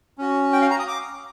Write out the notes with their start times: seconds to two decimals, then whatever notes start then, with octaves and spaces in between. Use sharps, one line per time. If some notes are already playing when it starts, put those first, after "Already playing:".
0.18 C#4 F#4
0.53 G5
0.62 F5
0.70 A#5
0.79 D#6
0.88 D6